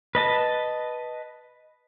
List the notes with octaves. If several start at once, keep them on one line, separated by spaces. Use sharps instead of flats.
B4 D#5 A5